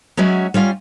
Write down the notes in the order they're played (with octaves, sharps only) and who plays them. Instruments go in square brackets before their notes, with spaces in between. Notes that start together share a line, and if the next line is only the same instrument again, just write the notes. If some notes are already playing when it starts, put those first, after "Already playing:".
[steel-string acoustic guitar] F#3 G#3 C#4 F#4 E5
G3 C#4 F4 F5